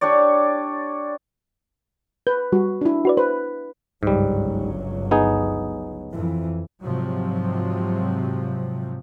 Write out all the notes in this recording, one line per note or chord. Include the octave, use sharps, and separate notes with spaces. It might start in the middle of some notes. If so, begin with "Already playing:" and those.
D4 G4 C#5 D5
B4 G6
G3 F#4
D4 E4
F#4 B4 D5
B4 C5
G1 C#2 G#2 F#3 G3
B3 D#4 G#4
F2 E3
G#2 C3 F3 F#3